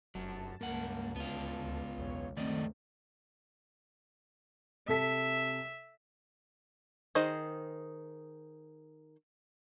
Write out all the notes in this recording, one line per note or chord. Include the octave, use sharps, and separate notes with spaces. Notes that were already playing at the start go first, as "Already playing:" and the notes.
F1 F#2 F#3 A5
C#2 G2 A#3 F#5
D2 B3 F4
B1 E2 C#5
F#2 D#3 A3 C4 D5 D#5
C3 A4 E5 B6
D#3 G#4 C5 D#5